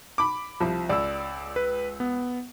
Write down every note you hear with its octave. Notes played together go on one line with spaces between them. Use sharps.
B5 D6
C2 F3
C#2 D5 E6
B4
B3